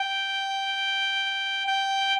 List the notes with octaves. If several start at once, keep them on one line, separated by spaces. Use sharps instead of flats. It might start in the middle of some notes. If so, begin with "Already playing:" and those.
Already playing: G5
G5